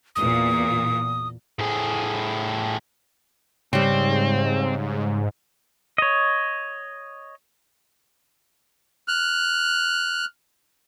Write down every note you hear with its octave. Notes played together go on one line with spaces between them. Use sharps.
E2 A#2 D#6
A2 G#4
G#2 C#3 G3 C4
C#5 D#5
F6 F#6